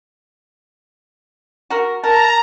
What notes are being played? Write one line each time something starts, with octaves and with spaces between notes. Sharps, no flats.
F#4 A#4
A#4 A5 A#5